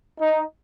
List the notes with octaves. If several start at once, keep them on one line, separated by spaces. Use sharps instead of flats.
D#4